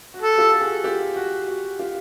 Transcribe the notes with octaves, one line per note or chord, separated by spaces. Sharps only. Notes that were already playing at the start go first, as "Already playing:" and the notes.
F#4
A4
F4 G4
F#4 G#4
F4 G4
F#4
F#4
F4 G4